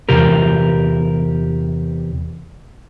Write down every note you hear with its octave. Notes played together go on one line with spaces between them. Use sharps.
E2 C3 G4 A#4